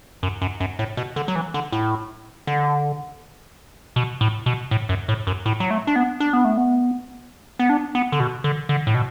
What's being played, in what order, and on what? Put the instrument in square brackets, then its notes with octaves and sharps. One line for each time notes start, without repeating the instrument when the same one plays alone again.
[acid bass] F#2
F#2
F#2
A2
B2
D3
F#3
E3
D3
A2
D3
B2
A2
B2
A2
F#2
A2
F#2
A2
F#3
A3
D4
B3
D4
B3
A3
B3
B3
D4
B3
D3
B2
D3
D3
A2
B2